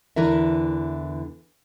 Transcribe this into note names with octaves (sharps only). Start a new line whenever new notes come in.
E2 D3 E3 E4 A#4 E5